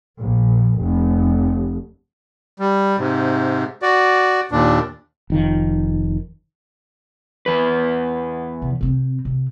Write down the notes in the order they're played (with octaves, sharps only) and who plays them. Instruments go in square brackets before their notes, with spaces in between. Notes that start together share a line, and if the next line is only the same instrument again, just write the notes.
[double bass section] A#1
F1
[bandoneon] G3
G#2 C3
F#4 D5
D#2 A#2 D4
[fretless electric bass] F1 D#3 F3
[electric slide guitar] E2 B4
[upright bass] C3
C3 C4
C3